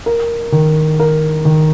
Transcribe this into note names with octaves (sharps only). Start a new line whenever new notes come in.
A#4
D#3
A#4
D#3